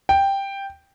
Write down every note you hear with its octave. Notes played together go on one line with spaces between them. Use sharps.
G5